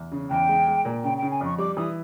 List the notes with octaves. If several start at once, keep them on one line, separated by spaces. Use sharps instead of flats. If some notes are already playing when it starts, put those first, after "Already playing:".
Already playing: E2
C#3
E2 G5
G#3
G#3
A#2
C#3 G5
C#3 G5
G#5
F2 C#6
G3 D6
E3 D#6